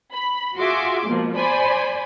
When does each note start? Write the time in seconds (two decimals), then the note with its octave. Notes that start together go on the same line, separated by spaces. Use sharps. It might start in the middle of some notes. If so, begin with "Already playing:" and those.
0.14 B5
0.57 F4 F#4 G#4 E5 C6 D6
1.06 B2 F3 G#3 A#3
1.36 C5 D5 G#5 B5